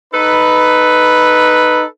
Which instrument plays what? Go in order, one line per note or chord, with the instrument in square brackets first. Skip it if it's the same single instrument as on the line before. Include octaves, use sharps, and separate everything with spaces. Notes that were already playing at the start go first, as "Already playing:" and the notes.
[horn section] D#4 A4 B4